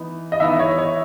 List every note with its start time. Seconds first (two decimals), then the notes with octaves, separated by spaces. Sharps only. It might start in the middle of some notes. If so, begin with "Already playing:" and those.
Already playing: E3 B3 D#4
0.32 D#5
0.40 E3 B3 D#4 E5
0.59 C#5
0.78 C#5